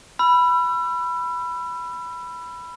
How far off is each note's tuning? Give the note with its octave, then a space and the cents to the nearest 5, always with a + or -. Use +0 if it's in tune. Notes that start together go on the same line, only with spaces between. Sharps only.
B5 +0 E6 +40